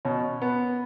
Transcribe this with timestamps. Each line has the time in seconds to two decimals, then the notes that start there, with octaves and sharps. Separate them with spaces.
0.05 B2 C#4
0.42 B3